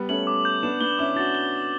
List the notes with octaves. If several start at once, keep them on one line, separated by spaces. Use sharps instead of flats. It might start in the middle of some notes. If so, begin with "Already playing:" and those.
Already playing: G3 B3
A3 C#4 F#7
D6
G6
B3 D4 E7
B3 D4 G7
C#4 E4 D6
D4 F#4 A6
G7
G6